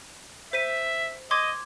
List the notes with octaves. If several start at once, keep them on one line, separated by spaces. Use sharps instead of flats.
C5 E5 B6 D#7
D#5 C6 D6 G#6